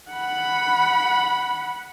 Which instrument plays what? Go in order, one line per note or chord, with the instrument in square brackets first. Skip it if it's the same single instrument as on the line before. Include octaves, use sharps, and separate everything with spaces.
[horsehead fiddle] F#5 B5